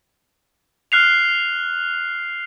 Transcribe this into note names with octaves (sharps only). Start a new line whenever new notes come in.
F6 F#6 C7 F7